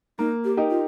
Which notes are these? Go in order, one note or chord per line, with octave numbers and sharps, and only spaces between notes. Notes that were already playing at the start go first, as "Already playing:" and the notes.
A#3 D#4
G4
D#4 G4 A#4
F4